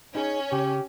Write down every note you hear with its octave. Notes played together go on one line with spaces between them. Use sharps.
C#4 D#4 G#4
C#3 G4